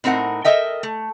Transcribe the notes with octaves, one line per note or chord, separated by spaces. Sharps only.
A2 C4 D#4 A#4 F#5
A4 A#4 D#5 E5 G5
A3